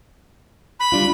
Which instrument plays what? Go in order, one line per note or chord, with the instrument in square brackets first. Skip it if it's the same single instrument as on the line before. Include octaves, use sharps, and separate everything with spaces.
[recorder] B5
[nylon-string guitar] G3 D4 F4